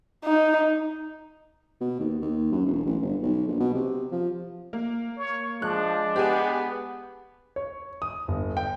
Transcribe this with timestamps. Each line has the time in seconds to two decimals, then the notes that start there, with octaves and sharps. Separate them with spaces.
0.25 D#4
1.81 B2
2.00 D#2
2.22 D#2
2.52 F#2
2.66 E1
2.86 A1
3.02 G1
3.22 B1
3.47 A#1
3.60 B2
3.75 C3
4.12 F3
4.73 A#3
5.17 C#5
5.62 F3 G#3 D4 F#6
6.16 B3 G4 G#4 G#5
7.56 C#5
8.02 D#6
8.28 G1
8.57 G5